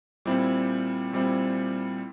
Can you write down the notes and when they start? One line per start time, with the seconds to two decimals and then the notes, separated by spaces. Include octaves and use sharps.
0.25 A#2 G3 C4 E4
1.13 A#2 G3 C4 E4